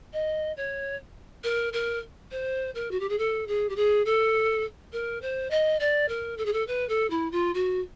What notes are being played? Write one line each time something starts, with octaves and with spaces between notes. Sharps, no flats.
D#5
C#5
A#4
A#4
C5
A#4
F#4
G4
G#4
A4
G#4
G4
G#4
A4
A#4
C5
D#5
D5
A#4
A4
G#4
A4
B4
A4
E4
F4
F#4